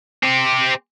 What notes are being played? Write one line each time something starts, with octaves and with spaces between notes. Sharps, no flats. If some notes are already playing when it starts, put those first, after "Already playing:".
C4 G4